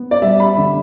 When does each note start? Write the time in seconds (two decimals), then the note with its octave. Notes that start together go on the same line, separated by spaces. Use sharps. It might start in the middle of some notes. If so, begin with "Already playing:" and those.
Already playing: B3
0.11 D5
0.22 G3 E5
0.40 B5
0.57 D3